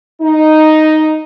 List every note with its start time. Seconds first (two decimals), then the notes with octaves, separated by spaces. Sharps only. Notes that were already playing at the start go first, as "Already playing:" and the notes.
0.21 D#4